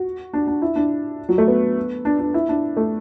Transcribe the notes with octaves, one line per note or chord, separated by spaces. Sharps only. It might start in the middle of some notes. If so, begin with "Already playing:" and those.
Already playing: F#4
D4
D4
E4
D4
F#3
A3
B3
D4
D4
E4
D4
A3